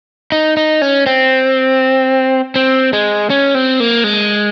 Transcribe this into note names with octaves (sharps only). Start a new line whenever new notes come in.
D#4
D#4
C#4
C4
C4
G#3
C#4
C4
A#3
G#3